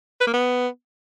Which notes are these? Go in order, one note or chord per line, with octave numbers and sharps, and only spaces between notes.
B4
A#3
B3